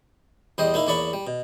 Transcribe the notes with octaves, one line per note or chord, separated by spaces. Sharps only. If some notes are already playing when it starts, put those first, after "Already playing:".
E2 G3 C5 D#5
A#3 D#4 E4
E2 A#3 C#5 D5 B5 C#6
G3
B2